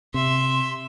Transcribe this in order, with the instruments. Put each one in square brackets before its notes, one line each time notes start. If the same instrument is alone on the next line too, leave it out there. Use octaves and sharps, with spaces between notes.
[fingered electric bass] C3 [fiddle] E5 [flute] C6